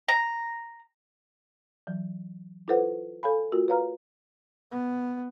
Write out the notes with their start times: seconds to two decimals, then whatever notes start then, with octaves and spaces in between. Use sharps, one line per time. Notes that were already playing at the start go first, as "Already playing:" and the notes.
0.08 A#5
1.87 E3 F#3
2.68 E4 F4 A4 B4 C5 F#5
3.23 A4 C#5 F5 G#5 B5
3.52 A3 F4 F#4 A#4
3.68 B4 C#5 F5 A#5 F6
4.71 B3